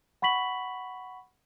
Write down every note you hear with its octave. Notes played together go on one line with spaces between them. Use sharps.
F#5 B5 C#6 B6 F#7